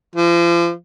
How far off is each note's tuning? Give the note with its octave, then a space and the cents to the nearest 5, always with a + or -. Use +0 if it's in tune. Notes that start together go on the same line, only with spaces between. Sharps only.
F3 -35